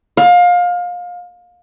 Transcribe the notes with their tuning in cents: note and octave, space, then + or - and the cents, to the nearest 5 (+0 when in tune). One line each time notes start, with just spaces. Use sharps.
F5 +25